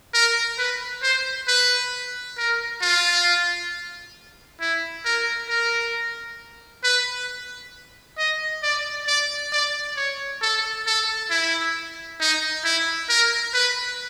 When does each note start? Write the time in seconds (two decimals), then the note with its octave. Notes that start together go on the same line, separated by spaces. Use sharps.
0.14 A#4
0.59 B4
1.03 C5
1.48 B4
2.38 A#4
2.82 F4
4.61 E4
5.05 A#4
5.49 A#4
6.84 B4
8.18 D#5
8.63 D5
9.07 D5
9.52 D5
9.97 C#5
10.42 A4
10.86 A4
11.31 E4
12.20 D#4
12.64 E4
13.09 A#4
13.54 B4